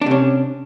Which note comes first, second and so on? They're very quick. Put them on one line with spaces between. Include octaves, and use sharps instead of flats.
D4 C3 C#4